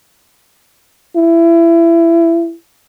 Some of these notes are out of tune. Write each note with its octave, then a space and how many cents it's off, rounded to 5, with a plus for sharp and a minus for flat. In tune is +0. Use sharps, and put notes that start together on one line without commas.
E4 +25